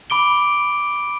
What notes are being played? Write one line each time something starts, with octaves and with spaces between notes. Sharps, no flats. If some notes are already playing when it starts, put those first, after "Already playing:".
B5 D6 D7 G7